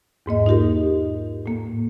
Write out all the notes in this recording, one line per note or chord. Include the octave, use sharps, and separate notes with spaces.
E2 G#2 A#3 D#5
D#4 F4 G4 A#4
A2 A#3